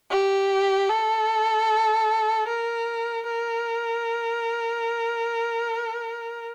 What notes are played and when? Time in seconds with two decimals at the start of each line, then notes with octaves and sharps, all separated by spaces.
0.11 G4
0.90 A4
2.48 A#4
3.27 A#4